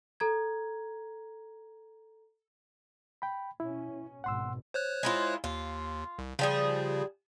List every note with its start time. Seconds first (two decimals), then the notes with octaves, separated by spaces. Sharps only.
0.20 A4 A#5 G#6
3.22 G5 B5
3.60 B2 C#4 E4
4.24 G#1 B2 F#5 C6 E6
4.74 C5 C#5 F#6
5.03 G#3 E4 F4
5.44 D#2 F4
6.19 C2
6.39 C#3 F3 G3 G#4